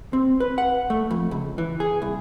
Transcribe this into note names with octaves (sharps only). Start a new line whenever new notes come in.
C4
B4
F#5
A3
F2
C#2
E3
G#4
C2